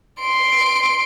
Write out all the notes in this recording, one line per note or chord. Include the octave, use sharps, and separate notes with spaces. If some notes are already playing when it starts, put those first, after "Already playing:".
C6 D7